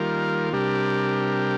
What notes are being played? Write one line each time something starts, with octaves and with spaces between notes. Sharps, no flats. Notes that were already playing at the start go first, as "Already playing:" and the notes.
Already playing: D#3 G3 A#3 F4 A#4
C3 G3 D4 G4 A#4